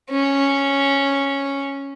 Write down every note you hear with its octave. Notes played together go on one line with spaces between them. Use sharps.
C#4